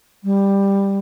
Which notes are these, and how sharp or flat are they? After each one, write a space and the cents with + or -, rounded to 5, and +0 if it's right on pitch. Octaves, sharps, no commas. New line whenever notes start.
G3 +10